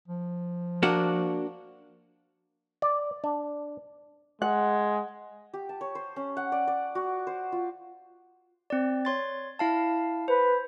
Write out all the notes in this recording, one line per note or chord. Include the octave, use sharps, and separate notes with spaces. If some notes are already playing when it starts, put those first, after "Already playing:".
F3
A#3 D4 F#4
D5
D4
G#3 F#5
G4
A5
C#5
C5
C#4
F#5
D5
D5
F#4
C5
F4
C4 D5
C#5 C6 A6
E4 F5 A5
B4 C5